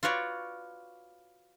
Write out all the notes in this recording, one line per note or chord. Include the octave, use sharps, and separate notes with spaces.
F4 F#4 B4 C#5 D5